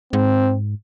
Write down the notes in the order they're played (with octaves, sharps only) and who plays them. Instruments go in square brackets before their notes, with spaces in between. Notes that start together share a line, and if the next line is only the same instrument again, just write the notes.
[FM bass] G#2 [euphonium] C4